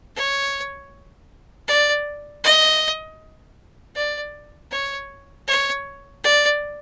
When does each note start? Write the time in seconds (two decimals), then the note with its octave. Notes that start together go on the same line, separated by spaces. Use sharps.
0.15 C#5
1.67 D5
2.43 D#5
3.95 D5
4.72 C#5
5.47 C#5
6.23 D5